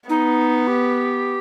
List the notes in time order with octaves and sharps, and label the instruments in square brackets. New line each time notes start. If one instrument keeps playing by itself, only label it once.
[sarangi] B3 [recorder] D#4
[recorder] G4